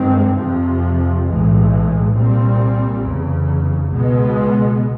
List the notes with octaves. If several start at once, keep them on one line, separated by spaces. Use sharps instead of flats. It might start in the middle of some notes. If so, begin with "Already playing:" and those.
Already playing: G2 D#3 G#3 C4
F2 C3 F3
B1 A2 E3 G#3
C2 A#2 G3 C4
F1 E2 C#3
C#2 B2 G#3 B3